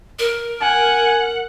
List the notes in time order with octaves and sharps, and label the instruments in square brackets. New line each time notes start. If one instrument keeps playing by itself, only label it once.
[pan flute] A#4
[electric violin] F#5 [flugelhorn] G#5